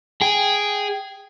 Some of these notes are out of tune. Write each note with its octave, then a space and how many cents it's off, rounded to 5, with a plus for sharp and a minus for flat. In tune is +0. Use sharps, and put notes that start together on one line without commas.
G#4 -5 G5 +0